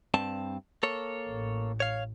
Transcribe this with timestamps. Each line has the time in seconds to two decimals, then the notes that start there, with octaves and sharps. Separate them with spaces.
0.14 G2 C4 A5
0.83 A#3 A4 C#5
1.27 A1 A2
1.80 C#5 F5